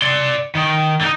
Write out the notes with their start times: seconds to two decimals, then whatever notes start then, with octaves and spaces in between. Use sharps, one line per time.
0.02 D5 C6
0.55 D#3
1.01 D3 D#4